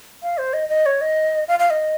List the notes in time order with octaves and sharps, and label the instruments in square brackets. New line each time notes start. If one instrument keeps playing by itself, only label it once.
[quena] F5
C5
D#5
D#5
C#5
D#5
F5
F5
D#5